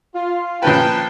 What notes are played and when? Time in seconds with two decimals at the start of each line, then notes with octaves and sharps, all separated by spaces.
0.15 F4
0.62 A#1 C#4 B4 G5 A5